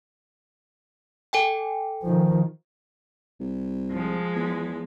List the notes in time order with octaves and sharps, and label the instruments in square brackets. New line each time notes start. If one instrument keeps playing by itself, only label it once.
[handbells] A4 G5 G#5
[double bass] D#3 F3
[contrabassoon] C2
[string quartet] F3 G#3
[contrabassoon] E2